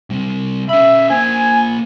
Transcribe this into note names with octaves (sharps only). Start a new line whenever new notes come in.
C3 G3
C#4 E5 B5
A#3 C5 G#5